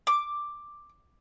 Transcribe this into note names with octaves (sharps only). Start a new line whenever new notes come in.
D6